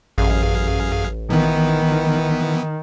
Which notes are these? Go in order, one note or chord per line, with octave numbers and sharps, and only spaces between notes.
A1 F#2 G#4 F5
D#3 E3 B3